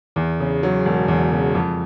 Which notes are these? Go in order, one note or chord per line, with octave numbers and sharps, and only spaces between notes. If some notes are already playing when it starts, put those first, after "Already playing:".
E2
C#3
F#3
E1
E2
C#3
F2